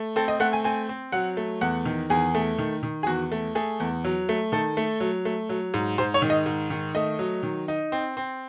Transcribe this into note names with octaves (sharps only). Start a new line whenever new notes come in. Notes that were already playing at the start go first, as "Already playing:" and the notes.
Already playing: A3
C4 A4
D#5
A3 F#5
G#5
C4 G#5
C4
F#3 F#5
A3
E2 F#5
D#3
E2 G#4
A3
D#3
D#3
G#4
E2 F#4
A3
A3 G#4
E2
F#3
A3
D#3 A4
A3
F#3
A3
F#3
G#2
G#2 C5
C#5
D#3
D#5
G#2
D#3
A3 D#5
F#3
D#3
D#4
C4
C4